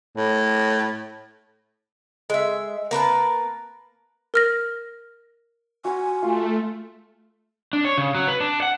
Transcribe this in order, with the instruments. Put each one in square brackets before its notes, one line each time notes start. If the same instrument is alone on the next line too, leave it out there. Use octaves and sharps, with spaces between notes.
[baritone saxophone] A2
[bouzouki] G#3 E5
A#3 A#4 B4 A5
[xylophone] A#4 F6 A#6
[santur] F#4 C6 [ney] G#5
[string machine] A3 [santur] F4
[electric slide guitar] D4
C#5
C#3
F#3
B4
D4
F#5